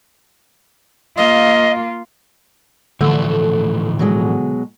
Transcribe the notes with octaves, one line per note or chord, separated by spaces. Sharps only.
A#3 F4 D#5
A2 D3 E3 F3 A3
B2 F#3 G#3